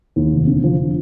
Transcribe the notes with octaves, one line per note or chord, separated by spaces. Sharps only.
D#2
F1
D3
F3